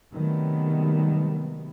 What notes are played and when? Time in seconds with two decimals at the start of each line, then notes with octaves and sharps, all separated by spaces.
0.13 C3 D#3 F#3 G3 A3 B3